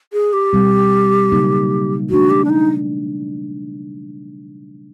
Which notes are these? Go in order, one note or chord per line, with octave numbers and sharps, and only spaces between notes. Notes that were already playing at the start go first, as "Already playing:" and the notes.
G#4
G4
B2 G3 C4
C#3 F#3 A#3 D#4
E3 A3 D4 F#4
G4
D4
D#4